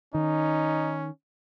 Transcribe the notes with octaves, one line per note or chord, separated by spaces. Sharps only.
D#3 C#4 D#4